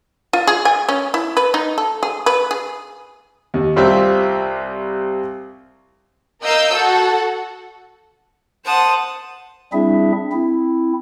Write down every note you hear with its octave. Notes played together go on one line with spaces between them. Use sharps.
F4
G#4
G#5
C#4
E4
B4
D#4
A4
G#4
B4
G#4
D#2
C2 G3 C4 F4 G4 E5
A#4 D#5 F5 E6 G6
F#4 A4 F#5
C5 F#5 A5 D#6
G3 C4 D4 E4 G#4 E5
C4 E4